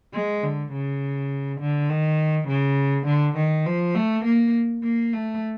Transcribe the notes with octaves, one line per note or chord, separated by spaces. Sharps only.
G#3
D3
C#3
D3
D#3
C#3
D3
D#3
F3
A3
A#3
A#3
A3